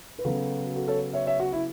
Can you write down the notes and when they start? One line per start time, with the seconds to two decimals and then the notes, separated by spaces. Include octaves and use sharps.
0.19 B4
0.25 C#3 F#3 B3 F#4 A4
0.76 F#4 A4
0.88 A4 C#5
1.13 C#5 E5
1.26 C#5 E5
1.40 F#4
1.53 E4